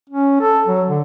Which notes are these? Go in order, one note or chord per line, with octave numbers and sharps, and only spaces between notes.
C#4
A4
F#3
D3